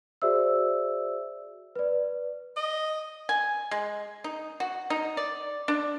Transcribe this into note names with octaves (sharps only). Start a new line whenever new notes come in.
F#4 G#4 C5 D5 E5 E6
B4 D5
D#5
G#5
G#3
D#4
F#4
D#4
D5
D4